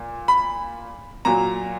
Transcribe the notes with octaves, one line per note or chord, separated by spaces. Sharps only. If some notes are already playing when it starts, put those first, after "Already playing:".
Already playing: A#2
B5
A#2 F#3 A#5